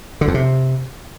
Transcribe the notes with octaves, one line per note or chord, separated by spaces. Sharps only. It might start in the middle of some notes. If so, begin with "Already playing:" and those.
D3
F2
C3